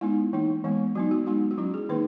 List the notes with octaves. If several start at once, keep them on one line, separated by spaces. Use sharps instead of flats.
G#3 B3 D#4 E4
E3 A#3 D#4
E3 G#3 B3
F#3 B3 D#4 F#4
F#4
G#3 B3 D#4 F#4
F#4
F#3 C#4 E4
G#4
D#3 A#3 D#4 B4